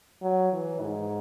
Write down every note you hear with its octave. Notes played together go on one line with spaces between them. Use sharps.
F#3
E3
G#2